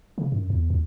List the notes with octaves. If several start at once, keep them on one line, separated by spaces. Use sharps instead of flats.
C#3
F#2
E2
D#2